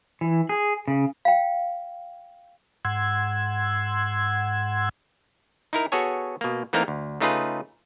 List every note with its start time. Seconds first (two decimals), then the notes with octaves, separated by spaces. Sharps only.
0.21 E3
0.49 G#4
0.88 C#3
1.25 F5 G5
2.85 G#2 F#5 C6 E6 G#6
5.73 D#4 E4 A#4
5.92 B3 F#4 G#4 A4 C#5 G#5
6.41 B2 A#3
6.73 E3 A3 A#3 C4 D#4 A#4
6.88 D2
7.20 C#3 A3 D#4 F4 G#4 B4